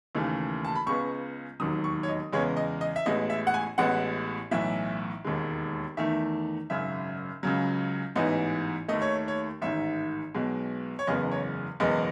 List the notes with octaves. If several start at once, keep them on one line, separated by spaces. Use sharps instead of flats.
D#2 C#3 E3 A3
A5
B5
C#2 C#3 G#3 B3 C#6
E1 D#2 D#3 F#3 D#6
C#6
C#5
D#5
E2 C#3 G#3 B3 C#5
D#5
D#5
E5
A1 A2 G#3 B3 D#5
E5
F#5
G#5
A1 A2 G#3 B3 F#5
B1 A2 E3 E5
E1 D#2 D#3 G#3
E2 D#3 A3 E5
G#1 F#2 C#3 E5
C#2 C#3 F#3
A1 G#2 E3 B3 D#5
D#2 D#3 A3 D#5
C#5
C#5
A1 G#2 D#3 E5
B1 B2 G#3
C#5
F#1 E2 C#3 G#3 B3 D#5
C#5
F#1 E2 B2 G#3 B3 D#5